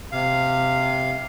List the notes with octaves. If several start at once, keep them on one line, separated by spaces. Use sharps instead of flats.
C3 F5